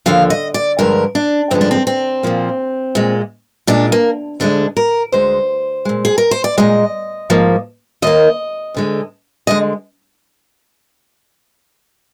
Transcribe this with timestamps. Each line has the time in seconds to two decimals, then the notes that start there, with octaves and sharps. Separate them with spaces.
0.06 D#2 D3 F3 F5
0.30 D#5
0.54 D5
0.78 G2 D3 F3 G#3 A#4
1.15 D4
1.51 G2 D3 F3 G#3 C4
1.61 D4
1.71 C4
1.87 C4
2.23 A#2 F3 A#3
2.95 A#2 G#3
3.67 A#2 G#3 D4
3.92 A#3
4.40 D2 D3 G#3 D4
4.77 A#4
5.12 D2 D3 G#3 C5
5.85 A#2 G#3
6.05 G#4
6.18 A#4
6.31 C5
6.44 D5
6.58 A#2 G#3 D#5
7.30 G#2 F3 A#3
8.02 D#2 D#3 A#3 D#5
8.74 D2 D3 G#3
9.47 D3 G#3 D#5